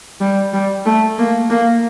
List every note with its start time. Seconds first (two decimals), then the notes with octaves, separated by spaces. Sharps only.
0.21 G3
0.54 G3
0.86 A3
1.18 A#3
1.50 A#3